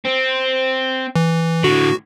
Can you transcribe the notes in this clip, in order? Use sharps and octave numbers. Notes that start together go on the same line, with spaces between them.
C4
E3
A2 D3 F#4